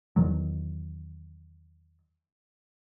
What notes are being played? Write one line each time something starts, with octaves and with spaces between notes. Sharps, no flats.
E2 D#3 F#3